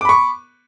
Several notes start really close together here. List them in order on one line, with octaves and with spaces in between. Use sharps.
D6 B5 C#6